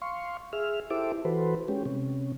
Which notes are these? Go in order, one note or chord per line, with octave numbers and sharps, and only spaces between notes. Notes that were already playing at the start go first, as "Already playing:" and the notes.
F5 C6 C#6
G#4 E5 F6
E4 G4 A4 C5 E5 D6
E3 F#4 A4 B4 C5
G#3 C#4 G4
C3 C#4